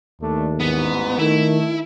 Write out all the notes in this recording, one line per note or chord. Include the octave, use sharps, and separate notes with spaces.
D#2 A3 D4
A1 E2 G#2 B3
D#3 A3 E4